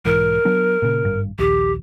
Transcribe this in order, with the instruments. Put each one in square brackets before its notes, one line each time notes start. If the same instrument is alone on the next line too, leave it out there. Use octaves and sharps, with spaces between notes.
[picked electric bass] B1 G#2 E3 [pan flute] A#4
[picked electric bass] F#3 B3 D4
A#2 C#3
G#1 G2
[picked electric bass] A#1 D#2 [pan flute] G4